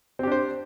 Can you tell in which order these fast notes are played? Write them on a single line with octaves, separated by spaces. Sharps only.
C4 G4 D4 C5